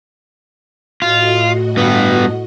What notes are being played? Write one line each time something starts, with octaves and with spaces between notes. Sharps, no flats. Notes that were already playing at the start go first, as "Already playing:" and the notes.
A2 F4 F#4 D#5
G2 B3